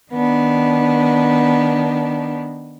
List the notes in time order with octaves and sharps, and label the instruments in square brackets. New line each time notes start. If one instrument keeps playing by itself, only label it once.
[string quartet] D#3 B3 D4